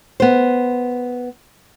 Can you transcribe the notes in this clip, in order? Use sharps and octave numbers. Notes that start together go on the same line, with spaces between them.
B3 C5